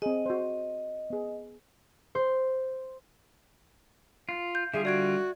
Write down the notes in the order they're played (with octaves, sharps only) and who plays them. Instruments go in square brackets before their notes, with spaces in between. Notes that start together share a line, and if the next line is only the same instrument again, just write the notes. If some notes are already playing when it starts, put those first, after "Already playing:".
[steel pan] C4 G#4 [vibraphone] D#5
[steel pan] F#4 C5
B3 G#4
[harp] C5
[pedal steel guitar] F4
[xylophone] G6
[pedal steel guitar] D3 G3 F4 [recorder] G#4 [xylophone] E5
[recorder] F#4 [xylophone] D5 G#6 D7